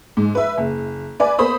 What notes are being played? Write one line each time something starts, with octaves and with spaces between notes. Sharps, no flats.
G#2
B4 E5
F#1
B4 D5 G#5
A#3 B3 C5 B5 D#6